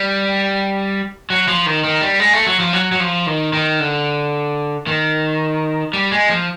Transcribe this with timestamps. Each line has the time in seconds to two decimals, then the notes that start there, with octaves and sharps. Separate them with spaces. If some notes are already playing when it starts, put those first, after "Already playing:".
Already playing: G3
1.30 F#3
1.48 F3
1.66 D#3
1.84 D#3
2.01 G3
2.20 G#3
2.33 A3
2.47 F#3
2.60 F3
2.73 F#3
2.92 F#3
3.00 F3
3.27 D#3
3.53 D#3
3.80 D3
4.87 D#3
5.93 G3
6.12 G#3
6.30 F3